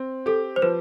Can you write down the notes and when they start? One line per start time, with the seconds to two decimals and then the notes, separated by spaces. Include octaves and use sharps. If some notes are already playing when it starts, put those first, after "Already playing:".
Already playing: C4
0.26 G4 A4
0.56 C5
0.62 F3 B4